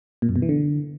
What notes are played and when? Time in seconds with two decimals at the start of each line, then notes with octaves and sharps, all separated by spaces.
0.22 A#2
0.29 F#2
0.36 B2
0.42 E3
0.49 D3